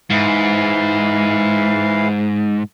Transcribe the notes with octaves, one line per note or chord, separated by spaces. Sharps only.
G#2 E3 F5